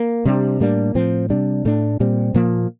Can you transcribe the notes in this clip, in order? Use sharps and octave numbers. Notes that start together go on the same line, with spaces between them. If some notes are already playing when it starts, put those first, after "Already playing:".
Already playing: A#3
C3 G3 D4
A2 G3 A#3 D4
A2 F3 C4
C3 G3 D4
A2 A3 D4
A#2 G3 C4
A#2 F3 A#3